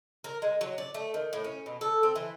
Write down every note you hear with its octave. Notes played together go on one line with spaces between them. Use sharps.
A#4
G#3
F#3
D5
A3
D#3
A2
C#4
B2
A4
C4
E3